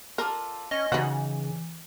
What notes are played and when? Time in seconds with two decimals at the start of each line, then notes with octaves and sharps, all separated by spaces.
0.18 F4 A4 A#4 D5
0.71 C#4 D#5 G#5 C#6
0.92 C#3 E3 D#4 F#4